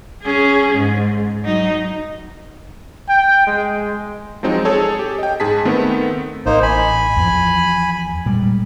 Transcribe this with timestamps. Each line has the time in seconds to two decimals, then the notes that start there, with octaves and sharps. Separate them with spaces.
0.23 C#4 G#4
0.76 G#2
1.44 F#3 D#4
3.09 G5
3.47 G#3
4.43 F3 F#3 G#3 C4 D#4
4.65 G#4 A4 C#5 A5
4.99 G4
5.19 D#5 G5
5.40 G#2 G#4 A5 B6
5.65 D#3 A3 B3 C4
6.46 A1 A#3 D#4 C5
6.62 G#5 B5
7.17 E2 F3
8.26 A#2 G3 G#3